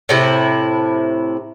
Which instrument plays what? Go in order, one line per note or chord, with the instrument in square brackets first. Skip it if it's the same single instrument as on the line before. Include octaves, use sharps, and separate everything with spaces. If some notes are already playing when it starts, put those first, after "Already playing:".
[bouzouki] A2 C3 E4